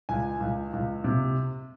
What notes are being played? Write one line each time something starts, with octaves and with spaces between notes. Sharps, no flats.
C#2 G#5
C#2
C#2
C3